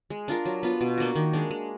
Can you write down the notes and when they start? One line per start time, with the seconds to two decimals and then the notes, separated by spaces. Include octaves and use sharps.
0.10 G#3
0.28 D4 F4 A#4
0.45 F#3
0.63 B3 F4
0.81 B2
0.98 A#3 D4 F#4
1.15 D#3
1.33 G#3 D4
1.51 G#3